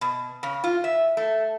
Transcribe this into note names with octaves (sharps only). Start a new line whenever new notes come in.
B2
C#3
F4
E5
A3